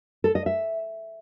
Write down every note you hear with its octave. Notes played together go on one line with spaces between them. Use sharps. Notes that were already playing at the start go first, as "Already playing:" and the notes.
A4
D#5
E5